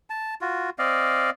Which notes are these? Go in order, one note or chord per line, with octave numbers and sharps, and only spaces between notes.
A5
F4 F#4
C4 D5 D#5 F5